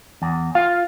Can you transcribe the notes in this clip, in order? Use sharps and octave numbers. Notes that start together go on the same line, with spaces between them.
E2
F4 F5